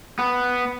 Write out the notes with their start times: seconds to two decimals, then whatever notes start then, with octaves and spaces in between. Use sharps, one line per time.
0.19 B3